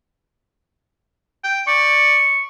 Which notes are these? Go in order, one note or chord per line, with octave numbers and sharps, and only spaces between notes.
G5
D5 C#6